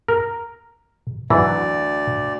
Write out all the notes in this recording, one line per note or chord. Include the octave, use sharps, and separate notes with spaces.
A#4
D2 E3 F#3 D5